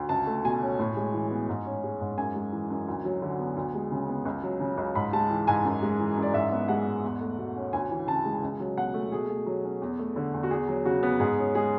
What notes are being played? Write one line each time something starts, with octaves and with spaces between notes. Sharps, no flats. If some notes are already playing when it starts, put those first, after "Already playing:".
Already playing: D2
C#2 A5
A3
B2 G#5
C#4
A2
G#3
E3
B3
G#2
C#4
G#3
G#2
F#2 G#5
G#3
E3
F#2
D2
F#3
D3
B3
D2
G#3
C#3
B3
C#2
F#3
C#3
C#2
G#2 B5
G#3 A5
E3
G#2 G#5
F#2
G#3
E3
F#2
D5
G#2 E5
B3
G#3 F#5
G#2
E2
A3
B2
C#4
D2 G#5
E3
C#3 A5
G#3
C#2
F#3
B2 F#5
A3
B2 G#4
A3
F#3
C#4
E2
A3
D3
E2
F#4
E2 G#4
F#3
C#3 F#4
B3
G#2 G#4
C#4
G#3 G#4